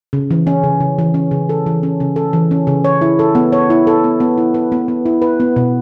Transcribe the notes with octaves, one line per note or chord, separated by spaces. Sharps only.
C#3
E3
C#4
C#3
C#3
E3
C#4
C#3
A4
E3
C#4
C#3
A4
E3
C#4
C#3
C#5
E4
A4
B3
C#5
E4
A4
B3
B3
E4
B4
B3
B3
E4
B4
B3
B2